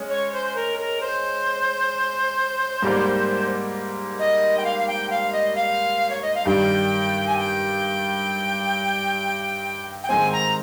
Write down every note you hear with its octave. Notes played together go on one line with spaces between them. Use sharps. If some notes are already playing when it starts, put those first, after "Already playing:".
Already playing: G#3 C#4
C#5
C5
C5
A#4
A#4
C5
G#2 G3 A#3
D#5
G5
F5
F5
G5
F5
D#5
F5
C#5
D#5
F5
G2 D#3 G3 G5
G#5
G5
G5
G#2 D#3 G#3 C4 G#5
A#5